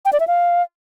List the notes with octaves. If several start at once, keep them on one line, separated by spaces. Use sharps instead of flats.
G5
D5
E5
F5